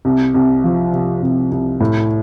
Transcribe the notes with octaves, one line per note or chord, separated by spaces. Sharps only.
C2
C2
F3
C3
C2
C2
A2